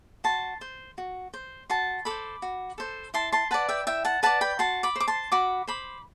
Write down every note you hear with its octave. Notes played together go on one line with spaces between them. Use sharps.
F#4 A5 C6
C5
F#4
C5
F#4 A5 C6
A4 C5 B5 D6
F#4
A4 C5
E4 A5 C6
A5 C6
B4 D5 F#5 A5
E5 G5
E4 E5 G5
F#5 A5
B4 D5 F#5 A5
G5 B5
F#4 A5 C6
B5 D6
C5 D6
A5 C6
F#4 B5 D6
C5 B5 D6